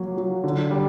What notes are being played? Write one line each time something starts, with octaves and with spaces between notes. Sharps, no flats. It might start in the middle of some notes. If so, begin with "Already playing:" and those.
Already playing: F#3 A#3
F#3
D3
G3